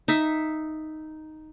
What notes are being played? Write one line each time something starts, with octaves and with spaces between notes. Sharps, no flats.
D#4 E5